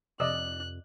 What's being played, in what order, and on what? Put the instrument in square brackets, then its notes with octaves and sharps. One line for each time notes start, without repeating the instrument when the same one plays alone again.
[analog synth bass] F2 [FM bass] C3 [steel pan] D5 D#5 E6 [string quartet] F#6